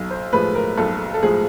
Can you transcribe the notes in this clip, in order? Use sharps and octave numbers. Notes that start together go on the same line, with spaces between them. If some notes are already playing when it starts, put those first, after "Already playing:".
Already playing: B1
C5
A2 F3 G#3 B4
A#4
B1 A4
A4
A2 F3 G#3 G#4